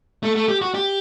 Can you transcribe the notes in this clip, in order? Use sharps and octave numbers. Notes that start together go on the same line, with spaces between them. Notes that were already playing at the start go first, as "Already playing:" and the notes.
A3
A3
G4
F#4
G4